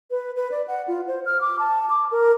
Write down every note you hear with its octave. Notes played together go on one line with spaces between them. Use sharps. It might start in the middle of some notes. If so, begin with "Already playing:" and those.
B4
B4
D5
F#5
F4
C5
F6
D6
A5
D6
A#4